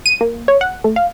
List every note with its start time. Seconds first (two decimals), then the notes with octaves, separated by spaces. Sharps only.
0.06 D#7
0.21 A#3
0.48 C#5
0.61 F#5
0.84 A3
0.96 F5